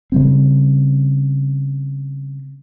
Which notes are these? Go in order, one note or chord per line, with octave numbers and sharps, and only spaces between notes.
C#3 G3 C4